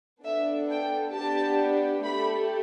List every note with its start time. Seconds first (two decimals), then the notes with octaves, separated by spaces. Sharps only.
0.24 B3 D4 A4 E5
0.70 G5
1.15 B3 D4 G4 A5
2.04 A3 G4 B5